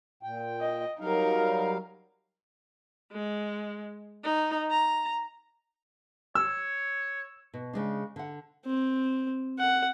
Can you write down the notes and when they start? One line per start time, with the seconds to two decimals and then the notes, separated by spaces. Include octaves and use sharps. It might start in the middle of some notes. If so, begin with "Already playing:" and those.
0.23 A#2 G5
0.61 D#5
1.01 F#3 G3 D#4 A#4 F5
3.12 G#3
4.23 D#4
4.71 A#5
6.35 C#5 E6
7.54 B2
7.73 C#3 G#3 D4
8.16 D3 F#5
8.66 C4
9.59 F#5